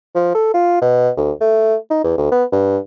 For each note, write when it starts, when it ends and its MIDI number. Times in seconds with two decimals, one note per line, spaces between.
0.15 0.34 53
0.35 0.52 69
0.54 0.80 65
0.81 1.10 47
1.17 1.32 38
1.41 1.76 57
1.90 2.02 63
2.04 2.17 40
2.18 2.31 38
2.32 2.45 59
2.52 2.78 43